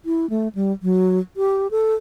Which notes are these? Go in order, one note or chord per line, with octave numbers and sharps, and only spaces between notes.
E4
A3
G3
F#3
G4
A4